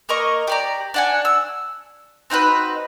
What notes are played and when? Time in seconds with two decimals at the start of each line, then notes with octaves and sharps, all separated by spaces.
0.09 A#3 A#4 D#5 C#6
0.47 G4 D5 A#5
0.94 D4 F#5 G#5
1.25 E6
2.30 C4 D#4 F#4 B4